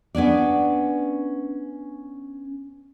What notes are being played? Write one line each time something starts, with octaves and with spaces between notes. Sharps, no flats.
B3 C#4 D4 D5